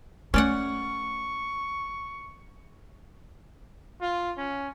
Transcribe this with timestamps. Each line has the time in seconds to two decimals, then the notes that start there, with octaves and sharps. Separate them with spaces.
0.34 A3 C#4 D5 F#5 C#6
4.01 F4
4.37 C#4